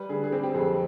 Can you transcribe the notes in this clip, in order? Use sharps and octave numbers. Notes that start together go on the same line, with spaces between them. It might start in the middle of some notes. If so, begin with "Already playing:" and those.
Already playing: G3 B4
D3 G#4
G#4
C4 G4
G4
F2 G#4